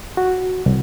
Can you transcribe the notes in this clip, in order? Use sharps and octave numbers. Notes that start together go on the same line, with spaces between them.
F#4
C2